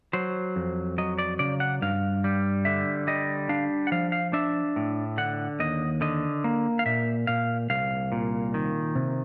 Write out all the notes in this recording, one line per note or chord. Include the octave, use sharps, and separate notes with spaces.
F#3 C5
F2
F#3 D#5
D5
C#3 D5
F#5
G2 F5
G3
D3 E5
G3 D#5
D4 F5
F#5
F3 F5
F5
D4 E5
A2
D3 F#5
D#2 D#5
D3 D#5
A#3
F5
A#2 E5
A#2 F5
C2 F5
A#2
D#3
C3